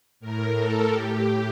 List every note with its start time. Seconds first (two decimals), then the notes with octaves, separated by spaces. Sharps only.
0.20 A2 A#4
0.56 A4
0.91 A2 G4